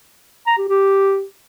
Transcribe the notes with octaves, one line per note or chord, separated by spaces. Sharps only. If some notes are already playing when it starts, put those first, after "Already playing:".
A#5
G4
G4